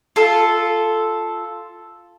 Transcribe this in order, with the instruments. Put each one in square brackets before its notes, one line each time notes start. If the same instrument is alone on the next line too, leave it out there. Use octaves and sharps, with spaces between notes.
[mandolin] F4 A4